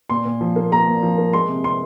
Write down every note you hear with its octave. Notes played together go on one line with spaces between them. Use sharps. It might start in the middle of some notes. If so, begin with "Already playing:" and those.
A#2 C6
A#2
F3
A#3
A#3 A#5
A#2
F3
A#3
G#3 C6
C3
C3 C6